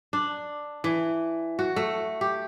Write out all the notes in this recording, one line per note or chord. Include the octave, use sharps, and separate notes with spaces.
D4
E3
F#4
A3
G4